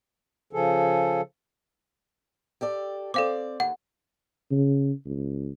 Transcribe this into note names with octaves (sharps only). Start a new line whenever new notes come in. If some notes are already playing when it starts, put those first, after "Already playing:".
C#3 F3 G#4 A4
G4 A4 D5
C4 A4 D5 F5 D6
D#2 F#5
C#3
C#2